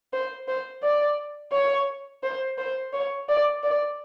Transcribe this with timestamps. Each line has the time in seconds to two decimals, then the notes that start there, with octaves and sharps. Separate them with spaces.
0.13 C5
0.48 C5
0.83 D5
1.52 C#5
2.23 C5
2.58 C5
2.93 C#5
3.28 D5
3.63 D5